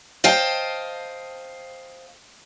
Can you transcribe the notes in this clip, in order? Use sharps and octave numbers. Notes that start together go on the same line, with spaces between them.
C5 D#5 F5 G5 A5